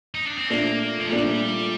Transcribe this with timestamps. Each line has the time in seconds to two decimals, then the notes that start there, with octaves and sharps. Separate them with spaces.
0.15 D#4
0.26 D4
0.38 C4
0.50 A#2 A3 A#3 D4
0.99 F3
1.09 A#2 G3 A3 D4